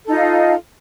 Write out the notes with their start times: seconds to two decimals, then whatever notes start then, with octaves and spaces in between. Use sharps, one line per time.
0.04 A4
0.08 D#4
0.11 F4
0.14 F5